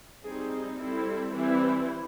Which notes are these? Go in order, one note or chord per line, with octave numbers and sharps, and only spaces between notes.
G3 C4 D#4 G#4
G3 C4 E4 A4
E3 G3 C4 E4